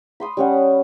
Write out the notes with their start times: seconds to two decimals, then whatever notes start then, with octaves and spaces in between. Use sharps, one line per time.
0.20 B5 C6 D#6
0.37 G3 C#4 F#5